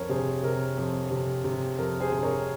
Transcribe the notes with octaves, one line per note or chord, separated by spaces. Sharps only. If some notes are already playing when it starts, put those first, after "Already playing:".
Already playing: F2 A#4 C#5
C3 G#4 C5
C3 A#4
F2
C3
C3
F2 A#4
G#4 C5
C3
A#4 C#5